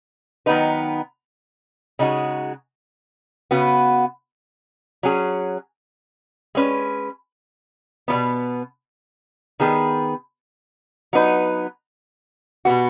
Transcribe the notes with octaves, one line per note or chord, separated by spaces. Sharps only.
D#3 F#3 B3 D#4 B4
C#3 G#3 D#4 F#4
C#3 B3 F#4 B4
F#3 C#4 G#4
G#3 C#4 B4
B2 F#3 B3
D#3 B3 G#4
F#3 B3 D#4 B4
B2 B3 F#4